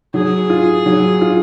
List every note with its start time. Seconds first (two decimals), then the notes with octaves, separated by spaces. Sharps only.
0.14 F#3 G#4
0.50 F4
0.86 F#3
1.21 F4